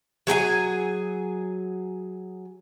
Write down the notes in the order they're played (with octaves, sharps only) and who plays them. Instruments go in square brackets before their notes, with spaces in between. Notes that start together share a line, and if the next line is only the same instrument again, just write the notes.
[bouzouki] F#3 G#4 F#5 G#5